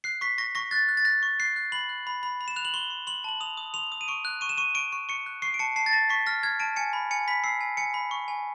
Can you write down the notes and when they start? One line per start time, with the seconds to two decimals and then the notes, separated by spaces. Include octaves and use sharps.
0.04 F#6 C7
0.21 C#6 B6
0.38 C#6 A#6
0.55 C#6 A#6
0.71 F#6 A6
0.88 F#6
0.97 A6
1.05 F#6 A#6
1.23 C#6
1.40 F#6 C7
1.56 F#6
1.72 B5 F#7
1.89 F#6
2.07 B5
2.23 B5
2.41 B5
2.48 E7
2.56 F#6 F7
2.65 F#7
2.74 C6 G7
2.90 C6
3.07 C6 F#7
3.24 A5 F#7
3.40 D#6 F7
3.57 D#6
3.74 C6 F7
3.92 D#6
4.01 D#7
4.08 C#6 D7
4.25 F#6
4.41 C#6 D#7
4.49 E7
4.57 C#6 D#7
4.75 C#6 D7
4.93 C#6
5.09 C#6 C#7
5.26 F#6
5.42 C#6 C7
5.54 D7
5.59 A5 C#7
5.76 A5 C7
5.86 A6
5.93 A5 A#6
6.09 C#6 B6
6.26 F6 A#6
6.43 F6 G#6
6.60 A5 D7
6.76 G#5 C#7
6.93 B5
7.11 G#5 C#7
7.28 B5 B6
7.44 E6 C7
7.61 G#5
7.77 G#5 C#7
7.94 B5
8.11 C#6
8.28 G#5